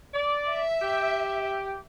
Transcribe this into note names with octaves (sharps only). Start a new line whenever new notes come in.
D5
E5
G4